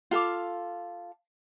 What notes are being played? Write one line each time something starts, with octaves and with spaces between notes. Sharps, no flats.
F4 A4 F5 D6